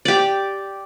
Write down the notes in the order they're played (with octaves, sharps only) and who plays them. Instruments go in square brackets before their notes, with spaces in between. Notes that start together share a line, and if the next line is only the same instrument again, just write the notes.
[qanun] G4 D5